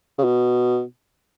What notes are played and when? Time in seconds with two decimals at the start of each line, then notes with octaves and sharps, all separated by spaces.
0.18 C#3
0.24 B2